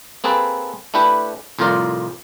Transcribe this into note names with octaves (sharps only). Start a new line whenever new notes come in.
A#3 C4 G#4 A4 B4
A3 D4 E4 G4 B4
C2 F2 A2 F4 A#4 D5